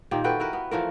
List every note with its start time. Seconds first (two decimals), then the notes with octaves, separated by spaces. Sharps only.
0.11 A#2 D#3 A#3 G4
0.24 F#4 A4 B4 G5
0.40 E4 A#4 B4
0.53 B3
0.71 E3 F3 A3 A#4